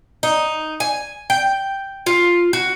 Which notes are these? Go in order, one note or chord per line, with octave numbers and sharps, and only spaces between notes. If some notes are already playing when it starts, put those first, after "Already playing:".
D#4
G#5
G5
F4
F#4